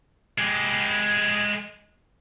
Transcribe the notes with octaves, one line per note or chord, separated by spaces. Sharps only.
G#3 G4